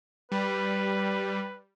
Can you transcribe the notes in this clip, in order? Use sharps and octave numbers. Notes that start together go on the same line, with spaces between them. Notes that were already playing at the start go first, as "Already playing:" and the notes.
G3 B4